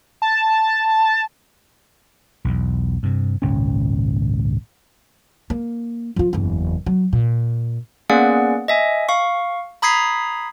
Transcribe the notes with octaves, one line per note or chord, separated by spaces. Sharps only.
A5
B1 E2
G2 C3
G#1 C#2 A#2 C#4
A#3
F3 F4
F#1 E2
F#3
A#2
A#3 B3 C#4 G#4 D5 F#5
D#5 E5 G#5
F5 C#6
A#5 B5 D#6 G#6 B6 C7